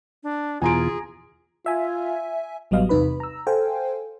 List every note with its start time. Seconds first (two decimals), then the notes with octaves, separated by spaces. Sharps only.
0.23 D4
0.62 E2 B2 E3 F4 G#4 G#5 A#5 D7
1.66 F4 E5 G#5
2.71 A1 F#3 G3 B3 D#5 F5
2.89 E2 C3 D#4 B4 B5
3.20 A#5 E6
3.47 A4 C5 F5 G5 G#5